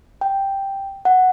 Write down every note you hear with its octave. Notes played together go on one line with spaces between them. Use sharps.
G5
F#5